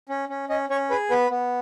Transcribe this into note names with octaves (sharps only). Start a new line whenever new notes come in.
C#4
C#4
C#4 D#5
C#4 C#5
G#4 B4
B3 B4
B3